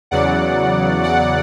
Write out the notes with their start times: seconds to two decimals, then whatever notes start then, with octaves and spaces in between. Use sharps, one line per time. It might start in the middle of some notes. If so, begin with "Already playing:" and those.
0.11 E2 C#3 F#3 D5 F#5
1.03 D5 F#5